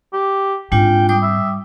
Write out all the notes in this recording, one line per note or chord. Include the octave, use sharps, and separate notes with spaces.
G4
G#2 G#3 C4 D4 F4 G5
G3 G5 D6 D#6
E5